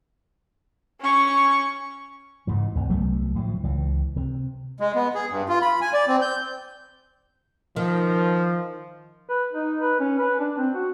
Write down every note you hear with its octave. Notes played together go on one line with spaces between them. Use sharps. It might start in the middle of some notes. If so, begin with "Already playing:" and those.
C#4 C#6
G#2 C#3 E3
D2 C3
C2 F#3 A3 B3
A2 D3 E3 F3
C#2 E3
C3
G#3
B3
G#4
G2
F4
B5
G#5
D5
C4
G6
D#3 F3
B4
D#4
B4
C#4
B4
D4
C4
F#4